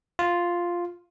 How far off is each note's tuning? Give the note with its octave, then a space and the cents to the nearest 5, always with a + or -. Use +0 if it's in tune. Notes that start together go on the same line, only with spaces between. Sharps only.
F4 +0